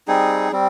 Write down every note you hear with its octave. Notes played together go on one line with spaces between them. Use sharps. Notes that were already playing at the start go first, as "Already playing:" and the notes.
G3 C4 D#4 G#4
G3 C4